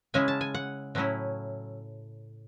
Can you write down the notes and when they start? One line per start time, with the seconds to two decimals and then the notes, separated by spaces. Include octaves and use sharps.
0.14 C#3 G#3 C#4 E4 G#5
0.28 A5
0.41 G#5
0.55 F#5
0.95 A2 F#3 C#4 E4